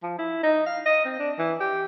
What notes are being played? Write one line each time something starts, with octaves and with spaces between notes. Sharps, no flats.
F3
E4
D#4
F5
D#5
C4
D4
E3
G4